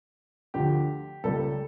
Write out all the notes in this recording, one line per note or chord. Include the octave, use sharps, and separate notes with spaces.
D2 D3 F3 A3 G4
C#2 C#3 G3 A#3 A4